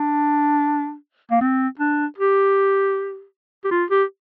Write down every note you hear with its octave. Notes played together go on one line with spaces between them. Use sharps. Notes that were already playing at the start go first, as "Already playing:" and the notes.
Already playing: D4
A#3
C4
D4
G4
G4
F4
G4